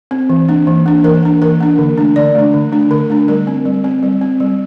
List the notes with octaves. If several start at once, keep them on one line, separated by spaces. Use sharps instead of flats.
C4
E3
A#3 D4
E3
A#3 D4
E3 A#4
A#3 D4
E3 A#4
A#3 D4
D3
A3 D4
D3 D5
A3 D4
D3
A3 D4
D3 A#4
A3 D4
G3 A#4
C4
G3
C4
G3
C4
G3